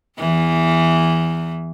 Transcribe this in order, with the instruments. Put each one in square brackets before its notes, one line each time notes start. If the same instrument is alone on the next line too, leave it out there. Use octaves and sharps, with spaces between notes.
[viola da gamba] E2 E3